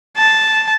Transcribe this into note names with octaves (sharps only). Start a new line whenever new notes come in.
A5